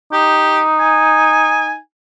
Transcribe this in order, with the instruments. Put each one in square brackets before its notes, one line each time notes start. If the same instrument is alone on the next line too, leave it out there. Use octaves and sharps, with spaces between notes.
[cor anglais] D#4 [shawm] G4
[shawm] G#5